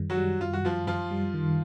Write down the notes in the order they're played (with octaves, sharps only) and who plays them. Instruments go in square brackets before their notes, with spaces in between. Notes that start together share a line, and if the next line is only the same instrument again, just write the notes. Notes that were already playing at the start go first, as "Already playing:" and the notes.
Already playing: [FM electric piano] F#2 D#3 G3
[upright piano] F#3 F#4
[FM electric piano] G3
[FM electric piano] F#2 [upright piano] F4
[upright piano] F#4
[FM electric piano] F#2 [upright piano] F3 F4
[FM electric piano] F#2 [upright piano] F3 F4
[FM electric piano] G3
D#3